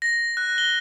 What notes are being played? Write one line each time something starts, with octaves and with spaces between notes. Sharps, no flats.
A#6
F#6
G7